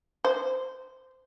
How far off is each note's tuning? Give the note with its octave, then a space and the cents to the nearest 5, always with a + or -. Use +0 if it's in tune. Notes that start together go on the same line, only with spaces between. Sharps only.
C5 -15